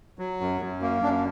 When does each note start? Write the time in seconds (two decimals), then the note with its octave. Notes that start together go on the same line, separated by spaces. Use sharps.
0.19 F#3
0.41 F#2
0.61 F#2
0.82 A#3
1.03 F#2 D4